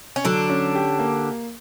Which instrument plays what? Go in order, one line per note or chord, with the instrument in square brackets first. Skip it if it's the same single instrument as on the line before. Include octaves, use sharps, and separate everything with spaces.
[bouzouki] C#4
[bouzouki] D3 D4 [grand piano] F#3
[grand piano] C#4
G4
A#3